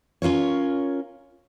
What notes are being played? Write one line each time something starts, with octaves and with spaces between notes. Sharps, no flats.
C#4 F4 A#4 C#5